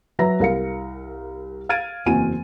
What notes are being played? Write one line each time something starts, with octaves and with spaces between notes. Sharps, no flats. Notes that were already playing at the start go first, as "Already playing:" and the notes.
F#3 B4 E5 A#5 A#6
C2 A#4 F5 C#7
F5 F6 G#6 A6 D7 D#7
F#1 E2 C4 F#4 G#5 D#7